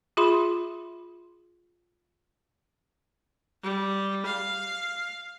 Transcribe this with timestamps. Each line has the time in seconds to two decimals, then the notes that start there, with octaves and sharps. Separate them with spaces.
0.17 F4 G#4 E5 B5 C6
3.62 G3
4.25 F5